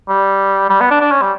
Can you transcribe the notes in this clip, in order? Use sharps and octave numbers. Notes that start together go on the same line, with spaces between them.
G3
G3
B3
D4
D4
C#4
G3